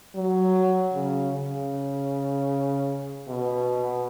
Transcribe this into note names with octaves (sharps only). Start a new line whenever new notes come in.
F#3
C#3
C#3
B2